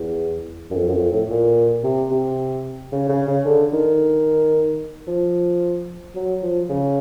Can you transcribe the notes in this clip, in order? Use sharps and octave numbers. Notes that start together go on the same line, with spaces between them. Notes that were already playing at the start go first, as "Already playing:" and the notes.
Already playing: E2
F#2
F2
F#2
F2
A2
A#2
C3
C3
C#3
C#3
C#3
D3
D#3
F3
F#3
F3
C#3